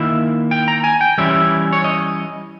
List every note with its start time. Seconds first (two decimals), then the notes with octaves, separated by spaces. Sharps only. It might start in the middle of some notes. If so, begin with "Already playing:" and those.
Already playing: D#3 A#3 E4 E5
0.51 G5
0.68 A#5
0.84 G#5
1.01 G5
1.18 E3 G3 C#4 E4 E5
1.73 C#5
1.84 D#5